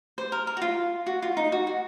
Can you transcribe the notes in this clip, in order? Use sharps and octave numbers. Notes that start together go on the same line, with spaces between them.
C5
A#4
A#4
F#4
F4
F#4
F4
D#4
F#4
F#4